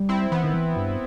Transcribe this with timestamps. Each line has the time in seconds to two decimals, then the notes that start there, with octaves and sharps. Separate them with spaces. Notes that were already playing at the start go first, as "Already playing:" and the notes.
Already playing: G3
0.09 C4 E4
0.32 E3 B3
0.44 D#3
0.54 E3
0.76 G2